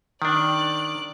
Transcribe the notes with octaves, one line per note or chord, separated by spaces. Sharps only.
D#3 D4 D5 F#6